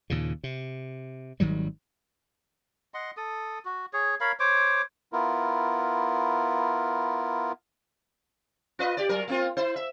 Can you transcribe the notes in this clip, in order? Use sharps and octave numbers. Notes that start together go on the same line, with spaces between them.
D#2 A#2 C#3
C3
G#1 D#3 F#3 G3
D#5 F#5 C6
A4 D#6
F#4
G#4 C#5
A#4 C#5 F5 B5
C5 C#5 D6
B3 E4 F4 A#4
F4 B4 D#5
G4 D5
F#3 A#4
A#3 C4 F4
E4 C5
E5